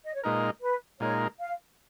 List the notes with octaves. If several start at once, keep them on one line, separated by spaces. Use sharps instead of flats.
D#5
C#5
A#2 G#3 D#4 A#4 B4
B4
A#2 G#3 D#4 A#4 C#5
F5